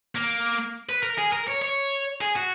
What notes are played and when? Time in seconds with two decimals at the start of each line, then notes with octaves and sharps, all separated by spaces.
0.15 A#3
0.89 B4
1.03 A#4
1.18 G#4
1.32 A#4
1.48 C#5
1.62 C#5
2.21 G#4
2.36 F#4